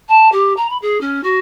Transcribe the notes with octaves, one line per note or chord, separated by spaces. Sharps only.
A5
G4
A#5
B5
G#4
C#4
F#4